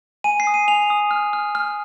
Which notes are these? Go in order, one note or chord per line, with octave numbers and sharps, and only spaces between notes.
G#5 D#7
C7
D#6
D#7
G#5 F7
D#6
F6
F6
F6